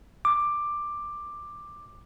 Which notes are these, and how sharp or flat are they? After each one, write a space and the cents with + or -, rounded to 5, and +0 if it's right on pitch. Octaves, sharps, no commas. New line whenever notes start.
D6 +10